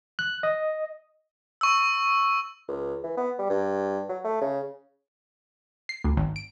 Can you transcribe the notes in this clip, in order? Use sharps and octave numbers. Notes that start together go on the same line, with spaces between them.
F#6
D#5
C#6 E6
C#2
E3
B3
G3
G2
F#3
A3
C#3
C7
D2
G#1
D7